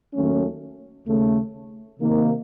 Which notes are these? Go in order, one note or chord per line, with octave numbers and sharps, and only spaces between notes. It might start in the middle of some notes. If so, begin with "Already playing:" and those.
D#2 D#3 F#3 A3 C#4
D#2 C#3 A3
C3 D#3 A#3 D#4